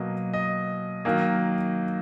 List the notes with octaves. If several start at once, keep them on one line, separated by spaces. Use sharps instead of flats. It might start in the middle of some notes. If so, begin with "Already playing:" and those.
Already playing: B2 F#3 A#3 D#5
D#5
D#3 F#3 A#3